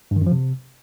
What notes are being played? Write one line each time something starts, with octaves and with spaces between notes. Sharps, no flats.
G2
D#3
F#2
F3
C3